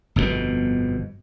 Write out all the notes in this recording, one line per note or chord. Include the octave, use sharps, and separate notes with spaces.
G1 F2 G#2 B2